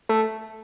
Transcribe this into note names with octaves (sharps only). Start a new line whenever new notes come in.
A3